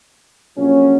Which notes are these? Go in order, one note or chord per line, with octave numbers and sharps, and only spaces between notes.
A#1 A#2 F#3 C#4